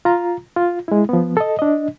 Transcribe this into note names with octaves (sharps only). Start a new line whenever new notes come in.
F4 A#5
F4
G#3 E4
F3 B3
A4 D#5
D4 D#5